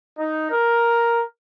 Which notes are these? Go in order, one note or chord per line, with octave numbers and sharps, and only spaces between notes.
D#4
A#4